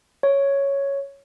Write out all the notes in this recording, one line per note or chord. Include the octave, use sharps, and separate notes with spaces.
C#5